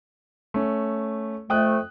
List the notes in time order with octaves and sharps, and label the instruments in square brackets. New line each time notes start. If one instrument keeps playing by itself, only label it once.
[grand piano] A3 C#4
[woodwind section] F2 A3 [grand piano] G5 D#6 F#6